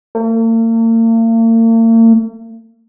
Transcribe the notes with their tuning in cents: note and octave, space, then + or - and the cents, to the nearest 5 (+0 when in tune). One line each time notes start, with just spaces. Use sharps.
A#3 -45